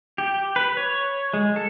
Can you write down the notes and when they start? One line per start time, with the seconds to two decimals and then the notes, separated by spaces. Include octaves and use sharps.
0.18 G4
0.56 B4
0.77 C#5
1.34 G#3
1.56 A4